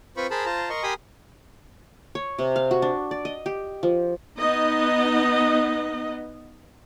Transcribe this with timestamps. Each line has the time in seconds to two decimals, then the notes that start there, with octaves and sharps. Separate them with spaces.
0.17 C4 F4 B4 C5 B5 C#6
0.31 G#4 A#4 C5 A5 B5
0.45 F4 C5 A5 A#5
0.70 A#4 D#5 C6 C#6
0.83 G4 A#4 G#5 B5 C6 D#6
2.15 C#5
2.39 C3
2.56 F5
2.71 F#4
2.82 D4
3.11 D5
3.25 D#5
3.46 G4
3.83 F3
4.38 B3 D#4 D#5